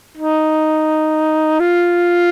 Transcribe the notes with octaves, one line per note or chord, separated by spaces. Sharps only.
D#4
F4